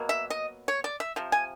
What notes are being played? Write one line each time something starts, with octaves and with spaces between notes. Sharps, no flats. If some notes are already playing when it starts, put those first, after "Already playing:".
Already playing: B2 F#3 A#3
E5
D#5
C#5
D5
E5
C3 F3
G#5